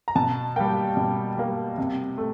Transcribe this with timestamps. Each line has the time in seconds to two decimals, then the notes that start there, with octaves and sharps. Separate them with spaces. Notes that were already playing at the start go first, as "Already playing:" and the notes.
0.08 A#5
0.15 B2 A5
0.56 G3 A#3 G5
0.97 B2
1.37 G3 A#3
1.78 C3
2.18 A3